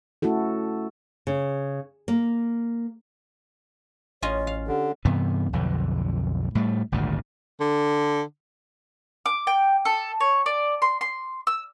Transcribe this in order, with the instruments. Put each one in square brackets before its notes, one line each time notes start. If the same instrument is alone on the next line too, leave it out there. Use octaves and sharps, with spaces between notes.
[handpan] A3 C#4 E4 F#4 A4
[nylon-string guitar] C#3
A#3
[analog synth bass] A1 [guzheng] C#4 F4 D#5 [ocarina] C#5
[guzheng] F5
[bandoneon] D3 [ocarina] G4
[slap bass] G2 C3 E3 B3
B1 F2 D3
A2 G3 A3
G#1 D2 G2 A#2
[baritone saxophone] D3
[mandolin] D6
G5
A4
C#5
D5
C6
C6
E6